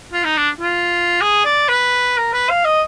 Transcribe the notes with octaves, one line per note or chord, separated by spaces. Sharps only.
F4
D#4
D4
F4
G#4
D5
B4
A#4
B4
F5
D#5